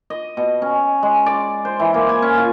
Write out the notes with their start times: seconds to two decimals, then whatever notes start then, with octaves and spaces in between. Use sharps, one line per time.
0.10 D#5
0.37 B2
0.62 C#4
1.03 G#3
1.26 D5
1.65 C5
1.79 E3
1.94 A#3
2.09 G#5
2.22 C#4
2.37 F4